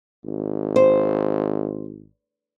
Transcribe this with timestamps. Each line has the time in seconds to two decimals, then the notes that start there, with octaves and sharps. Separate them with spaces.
0.24 G#1
0.76 C5